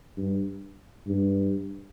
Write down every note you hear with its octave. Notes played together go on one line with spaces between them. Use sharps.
G2
G2